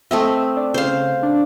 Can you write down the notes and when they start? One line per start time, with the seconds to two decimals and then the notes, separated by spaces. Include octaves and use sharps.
0.11 A3 C4 D#5 E5
0.57 D4
0.74 C#3 C5 F5
1.23 D4